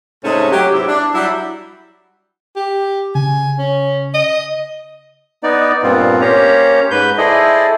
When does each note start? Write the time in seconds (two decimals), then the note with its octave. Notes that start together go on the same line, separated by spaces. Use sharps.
0.25 G#2 C3 G#3 A3 C#4 D#4
0.52 F#3 G4
0.73 G#2 C3 B3 E4
0.87 D4
1.14 F#3 G3 D4 E4
2.56 G4
3.15 C#3 G#5
3.59 C#4
4.14 D#5
5.43 B3 D#4 D5
5.83 G2 A#2 B3 C4 F4
6.21 A#3 C#4 G4 C5 C#5 A#5
6.91 G#2 B4 G6
7.18 E4 G#4 A4 C5 D5 D#5